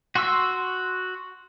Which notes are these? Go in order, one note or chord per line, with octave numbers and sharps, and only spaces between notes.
F#4 C6 C#6 E6